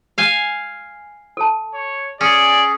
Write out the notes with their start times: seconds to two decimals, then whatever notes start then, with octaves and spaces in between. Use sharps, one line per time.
0.18 F5 G#5
1.37 A4 A5
1.74 C#5
2.21 C#4 G#4 D5